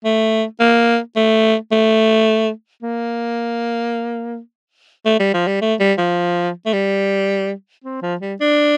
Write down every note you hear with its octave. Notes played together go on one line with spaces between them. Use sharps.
A3
A#3
A3
A3
A#3
A3
G3
F3
G3
A3
G3
F3
A3
G3
C4
F3
G3
D4